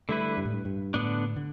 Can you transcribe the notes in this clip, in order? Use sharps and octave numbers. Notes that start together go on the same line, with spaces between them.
D3 G3 A3 E4 B4
G2
A2
G2
G2
A2 D3 B3 D4
D3